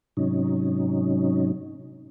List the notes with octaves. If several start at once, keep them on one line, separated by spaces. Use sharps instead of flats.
G#2 C3 F#3 C#4 D#4